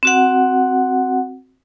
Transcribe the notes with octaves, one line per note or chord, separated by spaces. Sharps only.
C4 F#4 F#5